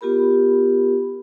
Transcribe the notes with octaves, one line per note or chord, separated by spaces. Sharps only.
B3 F4 G4 A#4 B5